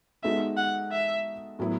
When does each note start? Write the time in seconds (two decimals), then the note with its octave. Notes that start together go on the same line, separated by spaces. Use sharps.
0.23 G#3 B3 D#4 F#4 A4 E5
0.57 F#5
0.92 E5
1.59 A2 F#3 B3 E4